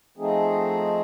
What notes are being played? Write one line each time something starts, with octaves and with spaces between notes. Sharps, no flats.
F3 A3 C4 D#4 G#4